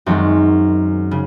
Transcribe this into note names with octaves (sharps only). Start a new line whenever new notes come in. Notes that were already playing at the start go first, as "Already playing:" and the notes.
F#2 D#3 G#3 C4
C#3